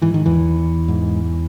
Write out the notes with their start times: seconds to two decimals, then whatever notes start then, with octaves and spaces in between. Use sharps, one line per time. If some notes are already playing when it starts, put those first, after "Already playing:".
0.02 G#2 E3
0.14 D#3
0.26 E2 E3
0.88 G#2